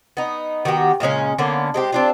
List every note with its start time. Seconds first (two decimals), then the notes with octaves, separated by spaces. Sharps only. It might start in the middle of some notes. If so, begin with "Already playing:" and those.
0.17 B3 D#4
0.65 D#3 B3 F#4 G4
1.00 A#2 C#3 G#3 C#4
1.38 D3 A#3 B3 C#4
1.74 G#3 C4 G4
1.92 C4 D4 F4